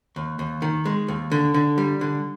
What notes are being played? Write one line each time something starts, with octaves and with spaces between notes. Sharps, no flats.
D#2
D#2
D#3
G#3
D#2
D3
D3
G3
D3